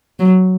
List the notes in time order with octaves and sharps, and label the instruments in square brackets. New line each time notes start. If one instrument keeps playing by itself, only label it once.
[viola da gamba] F#3